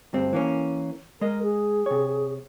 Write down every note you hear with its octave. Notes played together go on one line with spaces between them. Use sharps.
D2 G2 C4
E3 A#3 C#4
G#3 A#4 D#5
G#4
C3 C#5